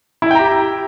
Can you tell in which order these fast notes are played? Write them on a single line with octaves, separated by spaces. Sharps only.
E4 E5 G5 A#5 G4